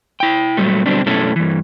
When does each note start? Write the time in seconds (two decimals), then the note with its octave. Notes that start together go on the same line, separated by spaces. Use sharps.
0.20 E4 G5
0.57 A#2 F#3 G3 A3
0.86 B2 D3 F#3 G3 C4 D4
1.06 F#2 B2 A3 C#4 E4 A4
1.36 G2 E3